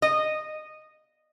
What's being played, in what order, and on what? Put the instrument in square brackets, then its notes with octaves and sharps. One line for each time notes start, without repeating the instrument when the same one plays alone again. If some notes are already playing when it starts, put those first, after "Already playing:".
[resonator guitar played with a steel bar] D#5